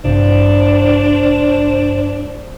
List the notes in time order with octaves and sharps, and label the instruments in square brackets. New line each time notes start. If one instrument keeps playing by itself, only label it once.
[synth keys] A1 G2 C3 [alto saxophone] D4 [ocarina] C5